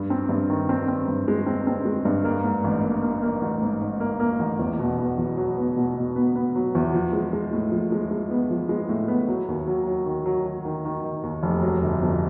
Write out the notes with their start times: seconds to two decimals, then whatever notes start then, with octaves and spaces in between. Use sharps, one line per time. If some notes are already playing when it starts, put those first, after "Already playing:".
Already playing: G2
0.10 C4
0.29 G2
0.50 D#3
0.69 C4
0.88 C4
1.08 G2
1.28 G#3
1.46 C4
1.67 C4
1.85 G#3
2.05 G2
2.24 A#3
2.44 G#2
2.64 A1
2.83 A#3
3.03 A#3
3.22 A#3
3.42 A1
3.62 G#2
3.81 G#2
4.00 A#3
4.20 A#3
4.39 A1
4.59 E2
4.79 B2
4.98 B3
5.18 E2
5.37 F#3
5.58 B3
5.77 B2
5.96 B2
6.16 B3
6.36 B3
6.55 F#3
6.75 E2
6.94 F3
7.13 G#3
7.33 G#3
7.53 A2
7.72 F3
7.92 G#3
8.11 G#3
8.31 B3
8.50 F3
8.69 G#3
8.89 A2
9.08 B3
9.28 F#3
9.48 D#2
9.68 F#3
9.87 F#3
10.06 D#3
10.26 F#3
10.46 F#3
10.65 D#3
10.85 D#3
11.04 D#3
11.23 D#2
11.43 F1
11.62 F#3
11.82 G1
12.02 F2